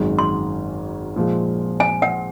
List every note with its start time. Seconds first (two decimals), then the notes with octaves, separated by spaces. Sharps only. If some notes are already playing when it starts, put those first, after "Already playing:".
Already playing: G#1 F#2 D#3 G#3
0.19 C6
1.16 A#2 F3 G#3
1.80 G#5
2.02 F#5